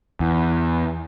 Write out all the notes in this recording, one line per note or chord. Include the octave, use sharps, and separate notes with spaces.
E2